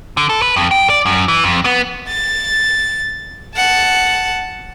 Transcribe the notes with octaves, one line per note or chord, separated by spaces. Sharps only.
D3
A4
B4
F2
G5
D5
F#2
E3
F2
B3
A6
F#5 A5